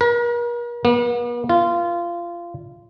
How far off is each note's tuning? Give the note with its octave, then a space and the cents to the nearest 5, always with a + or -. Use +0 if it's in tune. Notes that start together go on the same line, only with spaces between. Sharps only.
A#4 +40
B3 -45
F4 -20